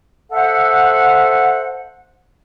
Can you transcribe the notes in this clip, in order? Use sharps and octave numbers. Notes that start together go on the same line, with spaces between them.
A4 C5 E5 F#5